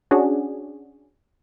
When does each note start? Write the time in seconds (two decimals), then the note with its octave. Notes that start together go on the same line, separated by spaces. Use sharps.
0.11 C#4 D4 F#4 G#4